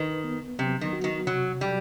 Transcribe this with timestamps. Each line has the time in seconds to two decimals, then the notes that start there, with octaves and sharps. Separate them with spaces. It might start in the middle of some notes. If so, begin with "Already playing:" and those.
Already playing: D#3 B4
0.24 B3
0.58 C3 F#3
0.81 D#3
0.93 F#4
1.04 D#3
1.27 C3 F#3
1.61 F#3 G3